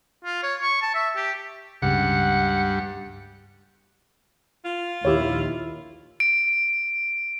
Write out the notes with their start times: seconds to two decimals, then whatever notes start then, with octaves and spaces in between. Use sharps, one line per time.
0.25 F4
0.43 C#5
0.62 C#6
0.82 A5
0.95 E5
1.17 G4
1.82 C#2 G2 C#3 F#5
4.64 F4
5.05 A#1 D#2 E4 G4 C#5
6.20 D7